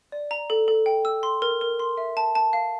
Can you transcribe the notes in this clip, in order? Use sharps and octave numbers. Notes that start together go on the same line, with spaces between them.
D5
A#5
A4
A4
G5
E6
C6
A#4
A#4
C6
E5
A5
A5
F5